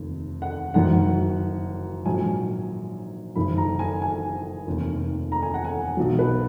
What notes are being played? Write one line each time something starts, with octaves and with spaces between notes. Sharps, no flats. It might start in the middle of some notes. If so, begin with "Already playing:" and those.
Already playing: F1 D#2
F#5
F#1 F#2 D#3 F#3 F#5
A#1 G#2 D#3 F#3 G#5
F#1 F#2 D#3 B5
A#5
G#5
G#5
F1 D#2 D#3
A#5
G#5
F#5
G#5
B1 B2 F#3
B4